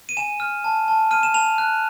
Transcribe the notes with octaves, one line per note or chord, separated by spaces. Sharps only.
D#7
G#5 E7
F6
A5
A5
F6 D#7
E7
A5 F7
F#6